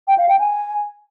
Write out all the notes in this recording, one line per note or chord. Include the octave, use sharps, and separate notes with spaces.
G5
F5
G5
G#5